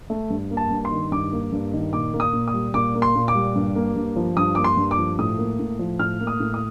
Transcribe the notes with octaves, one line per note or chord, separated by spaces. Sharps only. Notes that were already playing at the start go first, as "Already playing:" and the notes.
A3
G2
A#3
A5
G2
C6
D#3
G2 D6
A#3
G2
D#3
A#2 D6
A#3
D#6
A#2
D#6
G3
A#2 D6
A#3
C6
A#2
D6
G3
G2
A#3
G2
F3
G2 D#6
A#3 D6
C6
G2
D6
F3
A2 D#6
A#3
A2
F3
A2 F6
A#3
D#6
A2
D#6